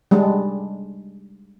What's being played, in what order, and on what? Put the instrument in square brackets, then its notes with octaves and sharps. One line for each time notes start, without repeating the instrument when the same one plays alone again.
[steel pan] G3 G#3 D4